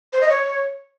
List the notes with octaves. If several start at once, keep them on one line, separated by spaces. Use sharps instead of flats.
C5
D#5
C#5